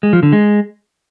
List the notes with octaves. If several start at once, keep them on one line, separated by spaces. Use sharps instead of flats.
G#3
F3
D3
G#3